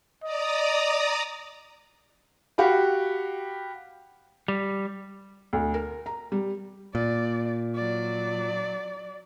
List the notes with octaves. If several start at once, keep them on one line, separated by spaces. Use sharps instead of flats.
D5 D#5 A#5 D#6
F#4 G4 F5 B5
G3
D2
A#4
A#5
G3
A#2 D5
F#3 D5